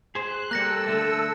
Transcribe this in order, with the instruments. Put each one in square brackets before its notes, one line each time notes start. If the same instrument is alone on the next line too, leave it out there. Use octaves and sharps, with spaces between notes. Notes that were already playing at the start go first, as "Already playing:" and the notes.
[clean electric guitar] G#4 C5 [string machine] F#6
[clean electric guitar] G3 A#3 [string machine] A4 E6 [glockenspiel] F#6 A#6 C#7
[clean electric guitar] D3 A3